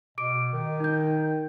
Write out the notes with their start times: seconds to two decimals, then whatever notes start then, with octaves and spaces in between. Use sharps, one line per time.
0.18 B2 D6 D7
0.53 D#3
0.80 D#4 G6